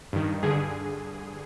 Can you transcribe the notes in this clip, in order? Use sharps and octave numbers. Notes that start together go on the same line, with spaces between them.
G2 D#3
G2 D3 G#4